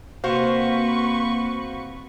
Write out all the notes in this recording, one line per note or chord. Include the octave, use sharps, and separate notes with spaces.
C3 A#3 F#4 B4 C5 F5 C#6